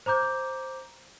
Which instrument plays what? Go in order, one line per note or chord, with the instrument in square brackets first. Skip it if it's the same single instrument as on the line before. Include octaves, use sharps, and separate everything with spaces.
[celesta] C5 A#5 D6 G6